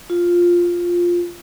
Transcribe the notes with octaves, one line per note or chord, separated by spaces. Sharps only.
F4